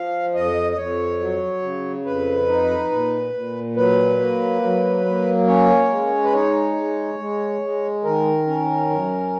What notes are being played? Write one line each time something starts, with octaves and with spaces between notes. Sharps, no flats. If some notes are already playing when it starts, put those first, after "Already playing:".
Already playing: F3 F5
F2 D#5
D#5
F2 C#5
F#3
C#3
F2 B4
D#4
A#2
A#2
F#3 B4
A#3
F#3
A#3
C#4 C#5
G#3
B4
D#4 C#5
G#3
G#3
G#3
D#3 A#4
C#4
F#2